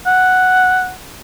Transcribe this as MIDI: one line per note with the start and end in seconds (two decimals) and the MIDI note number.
0.06 0.92 78